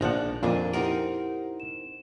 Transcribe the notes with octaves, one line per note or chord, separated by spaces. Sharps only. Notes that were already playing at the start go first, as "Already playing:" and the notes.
A#1 F3 D4 D#4 F#5
F2 A#2 A#3 D4 D6 D#7
C4 D#4 E4 G4 A#4 F#5
E7